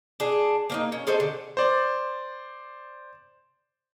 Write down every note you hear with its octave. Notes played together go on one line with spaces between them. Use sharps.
D4 G#4
A#3 C4 D#4
C#4
G#4 A4 C5 D#5
D3
C5 D5